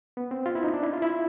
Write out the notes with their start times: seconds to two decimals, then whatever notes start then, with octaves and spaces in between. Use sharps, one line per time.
0.17 B3
0.31 C4
0.46 F4
0.55 E4
0.64 D#4
0.74 D4
0.83 E4
0.93 F4
1.02 E4